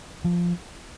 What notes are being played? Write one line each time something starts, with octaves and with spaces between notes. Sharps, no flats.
F3